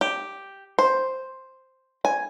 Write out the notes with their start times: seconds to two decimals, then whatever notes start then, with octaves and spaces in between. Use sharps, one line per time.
0.01 G4
0.79 C5
2.05 G#5